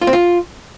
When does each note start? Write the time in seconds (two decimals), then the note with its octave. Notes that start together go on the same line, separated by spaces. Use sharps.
0.02 F4
0.07 C4
0.13 F4